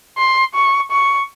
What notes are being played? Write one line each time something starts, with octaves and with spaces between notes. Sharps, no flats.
C6
C#6
C#6